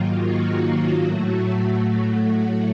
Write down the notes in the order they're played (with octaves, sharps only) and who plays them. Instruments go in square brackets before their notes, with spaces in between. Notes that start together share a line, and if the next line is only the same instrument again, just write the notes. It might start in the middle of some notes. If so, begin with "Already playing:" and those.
Already playing: [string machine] G#2 D#3 F#3 A#3 F4
F#4
A2 F#3 A3